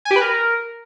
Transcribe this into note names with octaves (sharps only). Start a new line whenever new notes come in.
G#5
G4
B4
A#4